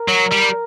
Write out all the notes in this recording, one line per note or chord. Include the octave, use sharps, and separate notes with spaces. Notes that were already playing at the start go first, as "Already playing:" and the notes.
Already playing: A#4
F#3
G3